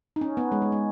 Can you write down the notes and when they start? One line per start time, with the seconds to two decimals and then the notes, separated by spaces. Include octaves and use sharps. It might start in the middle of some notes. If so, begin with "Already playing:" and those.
0.16 D#4
0.21 C#4
0.37 B3
0.52 G#3
0.62 G#3
0.72 G#3